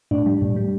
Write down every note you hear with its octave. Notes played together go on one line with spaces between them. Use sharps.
A2 D4
G3
A2
G3